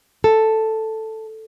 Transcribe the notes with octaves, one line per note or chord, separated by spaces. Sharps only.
A4